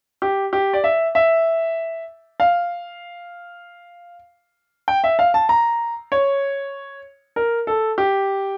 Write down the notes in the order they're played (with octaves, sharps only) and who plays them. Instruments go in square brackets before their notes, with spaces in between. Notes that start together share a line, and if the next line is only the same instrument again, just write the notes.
[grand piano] G4
G4
D5
E5
E5
F5
G5
E5
F5
A5
A#5
C#5
A#4
A4
G4